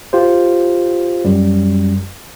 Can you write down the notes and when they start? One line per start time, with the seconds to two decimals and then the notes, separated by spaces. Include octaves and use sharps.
0.13 F4 G4 C5
1.25 F#2 G3